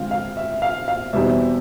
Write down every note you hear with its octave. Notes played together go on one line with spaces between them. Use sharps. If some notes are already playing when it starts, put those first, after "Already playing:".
Already playing: D3 F3 G#3 C4 F5
F5
E5
F5
F5
E2 B2 G3 C4 D#4 E5